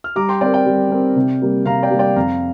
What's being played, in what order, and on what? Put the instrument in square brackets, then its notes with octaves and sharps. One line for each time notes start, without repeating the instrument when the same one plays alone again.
[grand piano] F6
[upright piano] G3 [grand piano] A#5 D6
[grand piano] G5 C6
[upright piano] C4 A#4 [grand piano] D5 G5
[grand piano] D5 G5
[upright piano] G3
C4 A#4
C3
G3 A#3
[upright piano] C3 [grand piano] F5 A#5
[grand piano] D5 G5
[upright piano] G3 A#3
[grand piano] D5 G5
[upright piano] F2 [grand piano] F5 A#5